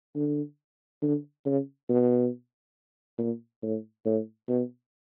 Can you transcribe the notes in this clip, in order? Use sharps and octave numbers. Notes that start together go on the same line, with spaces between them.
D3
D3
C#3
B2
A#2
A2
A2
B2